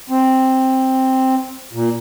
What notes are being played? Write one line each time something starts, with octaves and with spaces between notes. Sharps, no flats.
C4
A#2